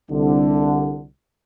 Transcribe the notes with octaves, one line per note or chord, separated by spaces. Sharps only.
C2 D3